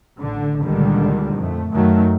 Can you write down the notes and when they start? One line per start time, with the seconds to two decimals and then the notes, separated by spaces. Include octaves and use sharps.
0.19 A1 D3
0.62 C#2 A#2 D3 D#3 G3
1.36 F2 A3
1.72 F#2 D#3 F#3 A3